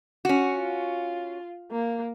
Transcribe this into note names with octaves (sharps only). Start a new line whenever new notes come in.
C#4 F#4
F4
A#3